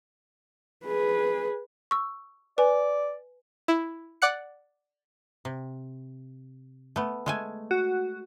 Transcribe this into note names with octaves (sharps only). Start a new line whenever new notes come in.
G#4 B4
C#6 E6
B4 D5 G#5
E4
D5 F#5 F#6 C#7
C3
A3 B3
G#3 A3 G#5
F#4